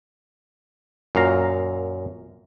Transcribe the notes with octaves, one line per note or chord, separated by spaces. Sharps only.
F#2 A#2 F5 A#5